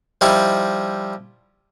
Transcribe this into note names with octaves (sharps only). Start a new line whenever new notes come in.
F3 G3 D#4 E4